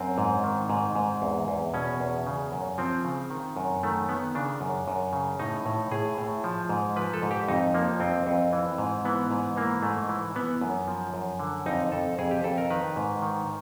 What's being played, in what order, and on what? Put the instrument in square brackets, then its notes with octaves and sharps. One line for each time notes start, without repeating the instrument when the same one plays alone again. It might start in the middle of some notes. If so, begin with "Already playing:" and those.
Already playing: [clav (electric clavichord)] F#2 C4
G#2
D#3
G#2
G#2
E2
E2
B2 C#4
E2
C#3
F#2
F3 C4
C#3
D#3
F#2
D#3 A3
D#3 B3
C#3 D4
F#2
F#2
C#3
A2 D#4
A2
A2 G#4
A2
F3
G#2
F3 B4
A4
G#2
G4
F2 D#4
F3 A#3
F2 C4
F2
E3
G#2
E3 B3
G#2
E3 A#3
G#2 A3
E3
E3 B3
F#2
F3
F#2
D3
F2 D#4
F2 A4
F2 G#4
G4
F2 A4
A#4
D#3 B4
G#2
D#3